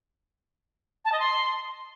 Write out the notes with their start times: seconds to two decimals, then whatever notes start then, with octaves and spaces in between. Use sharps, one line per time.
1.04 A5
1.12 D#5
1.19 C6